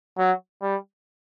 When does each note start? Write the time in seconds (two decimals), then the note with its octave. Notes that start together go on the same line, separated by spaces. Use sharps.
0.18 F#3
0.62 G3